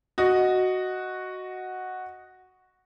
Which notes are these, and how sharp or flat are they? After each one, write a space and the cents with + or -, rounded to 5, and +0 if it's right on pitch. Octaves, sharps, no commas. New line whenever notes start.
F#4 +0 D#5 +0